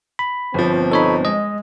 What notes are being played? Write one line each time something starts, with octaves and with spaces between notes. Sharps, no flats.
B5
G1 B2 F3 C4
D#4 A4 C#5 B5
G#3 D#5